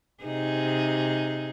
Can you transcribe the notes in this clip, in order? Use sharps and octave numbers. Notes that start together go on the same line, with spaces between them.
C3 D#4 G#4